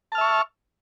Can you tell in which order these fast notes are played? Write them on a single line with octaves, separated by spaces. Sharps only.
A5 F6 E5 C#6